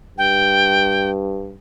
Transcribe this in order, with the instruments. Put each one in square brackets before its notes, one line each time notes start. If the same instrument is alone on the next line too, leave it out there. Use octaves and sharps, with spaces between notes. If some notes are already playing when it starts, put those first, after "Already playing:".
[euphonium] G2 [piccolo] G5